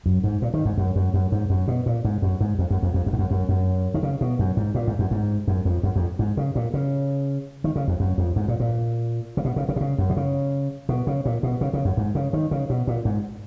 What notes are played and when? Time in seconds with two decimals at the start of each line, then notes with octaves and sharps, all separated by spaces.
0.06 F#2
0.24 G#2
0.42 A#2
0.54 D#3
0.65 G#2
0.78 F#2
0.96 F#2
1.14 F#2
1.32 G#2
1.50 F#2
1.68 B2
1.86 A#2
2.05 G#2
2.22 F#2
2.41 G#2
2.59 F2
2.70 F#2
2.83 F2
2.94 F2
3.06 F#2
3.13 G#2
3.19 F#2
3.31 F#2
3.49 F#2
3.94 D#3
4.03 C#3
4.21 B2
4.39 F#2
4.57 G#2
4.75 A#2
4.87 G#2
4.99 F#2
5.11 G#2
5.48 F#2
5.65 F2
5.83 F#2
5.96 F2
6.19 G#2
6.37 C#3
6.56 A#2
6.74 C#3
7.64 D#3
7.76 C#3
7.88 F2
8.00 F#2
8.18 F2
8.36 G#2
8.48 A#2
8.60 A#2
9.37 C#3
9.45 B2
9.56 C#3
9.69 C#3
9.76 B2
9.81 C#3
9.98 F#2
10.10 B2
10.17 C#3
10.89 B2
11.07 C#3
11.25 A#2
11.43 B2
11.61 C#3
11.73 C#3
11.85 F#2
11.97 G#2
12.15 C#3
12.33 D#3
12.51 C#3
12.70 B2
12.87 A#2
13.05 G#2